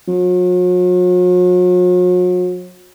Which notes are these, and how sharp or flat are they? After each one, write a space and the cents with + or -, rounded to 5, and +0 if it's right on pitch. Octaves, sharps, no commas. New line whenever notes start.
F#3 -45